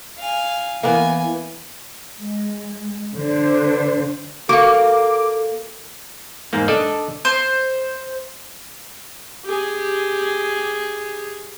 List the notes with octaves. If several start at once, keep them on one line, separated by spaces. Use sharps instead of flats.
F5 G#5
E3 A#3 B3 G#5
G#3
D3 D4 C5
A#3 F#4 A4 F5 D6
E2 G#2 A#3
D4 A4 D5 D#5
C5
G4 G#4